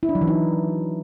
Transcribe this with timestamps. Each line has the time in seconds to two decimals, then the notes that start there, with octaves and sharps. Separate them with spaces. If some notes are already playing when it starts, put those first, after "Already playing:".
0.03 E4
0.09 D4
0.15 F#3
0.21 E3
0.28 D#4